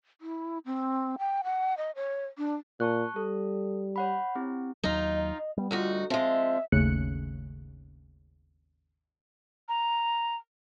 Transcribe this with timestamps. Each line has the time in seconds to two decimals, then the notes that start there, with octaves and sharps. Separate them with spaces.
0.21 E4
0.66 C4
1.19 G5
1.44 F#5
1.78 D#5
1.96 C#5
2.38 D4
2.80 A#2 A5 C#6 F#6
3.16 G3 A4
3.96 C#5 F#5 B5
4.35 C4 E4 G4
4.83 D#2 F#3 D#4 F4
5.16 D#5
5.57 G3 B3
5.71 D2 D#4 F4 F#4
6.10 F3 G#3 C4 E5
6.72 G#1 D#2 C#3 A3 F#6 C#7
9.69 A#5